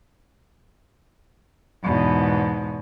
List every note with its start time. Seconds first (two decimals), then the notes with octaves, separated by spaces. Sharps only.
1.85 E2 G#2 B2